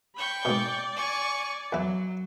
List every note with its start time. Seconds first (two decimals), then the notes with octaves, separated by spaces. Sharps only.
0.16 G5 B5 C#6 G6
0.45 G#2 B2 D5
0.95 G#5 C#6
1.73 E2 F#3 E4